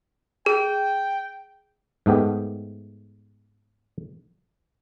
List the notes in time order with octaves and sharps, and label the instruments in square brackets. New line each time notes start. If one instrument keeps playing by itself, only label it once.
[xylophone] G#4 [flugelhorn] G5
[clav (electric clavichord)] G#2 A3 B3 G4